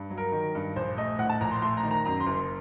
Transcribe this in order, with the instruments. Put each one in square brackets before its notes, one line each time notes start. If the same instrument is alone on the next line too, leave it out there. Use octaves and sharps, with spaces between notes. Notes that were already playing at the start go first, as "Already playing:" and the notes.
Already playing: [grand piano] G2
F#3
A#4
D#3
G2
A#1 C5
A3 D#5
A2 F#5
A5
A#1 A#5
C6
A3 C6
A#5
D#3
A#5
F#2 A#5
C6
F#1
C6